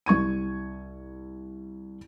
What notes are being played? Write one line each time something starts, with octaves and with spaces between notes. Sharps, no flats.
C2 C#6 G#6 D#7